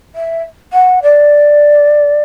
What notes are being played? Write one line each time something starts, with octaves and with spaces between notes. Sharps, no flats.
E5
F#5
D5